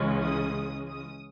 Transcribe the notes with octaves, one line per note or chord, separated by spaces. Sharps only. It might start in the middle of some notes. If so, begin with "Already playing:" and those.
Already playing: C#2 C#3 E3 G#3 C#4
D#6
D#6